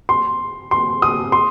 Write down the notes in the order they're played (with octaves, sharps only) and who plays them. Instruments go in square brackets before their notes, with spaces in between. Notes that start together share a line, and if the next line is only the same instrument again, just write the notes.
[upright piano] C6
C6
D#6
C6